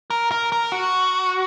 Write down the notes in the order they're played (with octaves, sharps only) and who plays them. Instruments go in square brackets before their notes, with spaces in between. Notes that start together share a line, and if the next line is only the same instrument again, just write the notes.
[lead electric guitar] A#4
A#4
A#4
F#4